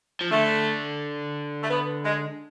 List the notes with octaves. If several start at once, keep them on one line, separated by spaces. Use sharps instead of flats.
F3
D3 A3
A3
B3
G#3